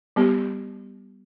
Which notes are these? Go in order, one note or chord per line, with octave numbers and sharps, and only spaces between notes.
G3 B3 G4